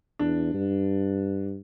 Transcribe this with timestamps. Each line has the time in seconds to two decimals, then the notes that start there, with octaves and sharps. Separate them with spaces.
0.19 E2 D4
0.54 G2